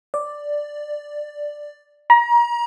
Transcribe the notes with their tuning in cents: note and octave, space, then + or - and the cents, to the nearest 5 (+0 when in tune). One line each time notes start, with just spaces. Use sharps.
D5 +5
A#5 +35